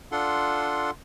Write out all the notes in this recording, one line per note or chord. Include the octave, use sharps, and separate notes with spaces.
D4 F4 A4 F#5 C6